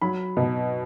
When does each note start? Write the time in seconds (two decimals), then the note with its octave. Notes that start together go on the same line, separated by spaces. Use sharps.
0.02 F#3 B5
0.37 B2